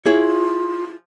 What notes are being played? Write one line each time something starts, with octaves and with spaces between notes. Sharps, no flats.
E4 F4 G#4 C#5